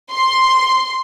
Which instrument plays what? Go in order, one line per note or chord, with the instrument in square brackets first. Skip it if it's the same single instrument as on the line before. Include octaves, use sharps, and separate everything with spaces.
[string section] C6